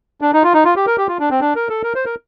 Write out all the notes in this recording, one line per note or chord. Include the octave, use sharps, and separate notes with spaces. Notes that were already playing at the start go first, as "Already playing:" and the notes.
D4
D#4
F4
D#4
F4
G4
A#4
G4
F4
D4
C4
D4
A#4
A4
A#4
C5
A#4